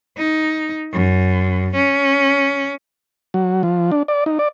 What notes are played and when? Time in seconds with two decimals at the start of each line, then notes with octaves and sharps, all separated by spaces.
0.18 D#4
0.93 F#2
1.75 C#4
3.34 F#3
3.63 F3
3.92 D4
4.08 D5
4.26 D#4
4.39 D5